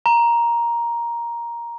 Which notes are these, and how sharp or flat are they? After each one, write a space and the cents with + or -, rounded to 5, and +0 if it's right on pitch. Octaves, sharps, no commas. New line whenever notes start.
A#5 +10